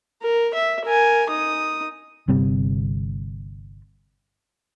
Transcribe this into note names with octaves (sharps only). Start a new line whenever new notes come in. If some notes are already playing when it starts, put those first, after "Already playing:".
A#4
E5
A#4 G#5
D#4 D#6
G1 C3 G3 C4